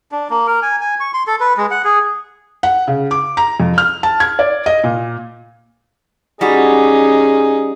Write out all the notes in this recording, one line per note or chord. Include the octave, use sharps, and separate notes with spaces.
D4
A#3
A#4
G#5
G#5
C#6
C6
A4
B4
G#3
F#5
G#4
F#5
C#3
D6
A#5
F2
F6
A5
G#6
D5
D#5
A#2
G3 C#4 D#4 F#4 G#4